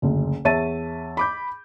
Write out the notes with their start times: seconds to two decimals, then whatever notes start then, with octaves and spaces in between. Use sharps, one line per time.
0.02 F#1 D2
0.45 E2 C#5 E5 A5 A6 D#7
1.17 B5 D6 G6